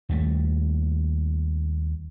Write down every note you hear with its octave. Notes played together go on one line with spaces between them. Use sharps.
D#2 G3 A3